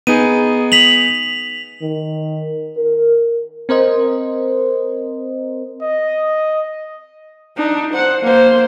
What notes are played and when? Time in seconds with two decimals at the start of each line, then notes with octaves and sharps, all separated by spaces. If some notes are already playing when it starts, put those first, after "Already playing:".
0.07 B3 D#4 G#4 D#7
0.72 B6 F7 F#7
1.82 D#3
2.77 A#4
3.69 C4 A#4 C5 D#5
5.82 D#5
7.57 D4 D#4
7.94 C5 F#5
8.23 A#3 C5